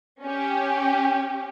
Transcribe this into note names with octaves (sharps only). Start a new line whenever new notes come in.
C#4 G4